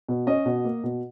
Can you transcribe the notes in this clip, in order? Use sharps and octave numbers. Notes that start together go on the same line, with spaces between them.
B2
C#4 D#5
B2
A#3
B2